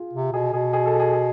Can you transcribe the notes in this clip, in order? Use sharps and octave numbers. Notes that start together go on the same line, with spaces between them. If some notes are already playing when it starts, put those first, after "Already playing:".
Already playing: F4 G#4
C3
B2 G#4
B2 G#4
G#4
A4
G#4
G#4